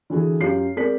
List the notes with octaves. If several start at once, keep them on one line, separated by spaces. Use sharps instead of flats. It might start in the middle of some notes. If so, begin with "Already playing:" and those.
D3 E3 F#4 G#4
F#2 F4 G4 C7
G#3 C4 A#4 D5 B6